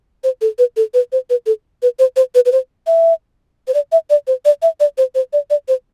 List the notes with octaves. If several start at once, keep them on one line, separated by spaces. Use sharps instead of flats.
C5
A4
B4
A4
B4
C5
B4
A4
B4
C5
C5
B4
B4
C5
E5
C5
D5
E5
D5
C5
D5
E5
D5
C5
C5
D5
D5
C5